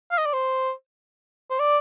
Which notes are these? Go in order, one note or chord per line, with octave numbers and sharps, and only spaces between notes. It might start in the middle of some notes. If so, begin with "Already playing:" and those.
F5
D#5
D5
C5
C5
D5